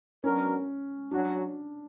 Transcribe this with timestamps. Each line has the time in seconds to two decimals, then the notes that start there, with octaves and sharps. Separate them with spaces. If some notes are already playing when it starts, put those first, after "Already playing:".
0.24 F#3 B3 C#4 D4 F#4 A#4
1.11 F#3 C#4 D4 F#4